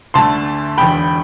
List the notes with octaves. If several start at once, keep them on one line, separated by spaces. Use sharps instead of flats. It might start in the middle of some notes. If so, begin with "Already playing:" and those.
D2 D3 A3 A5 C6
E1 E2 D3 G5 B5